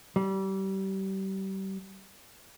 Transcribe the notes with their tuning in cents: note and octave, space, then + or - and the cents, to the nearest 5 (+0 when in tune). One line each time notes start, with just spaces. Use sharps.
G3 -30